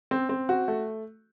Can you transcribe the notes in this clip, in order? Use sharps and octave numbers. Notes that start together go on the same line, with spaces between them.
C4
C4
F#4
A3